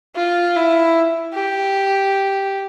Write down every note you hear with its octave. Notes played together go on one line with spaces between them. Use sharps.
F4
E4
G4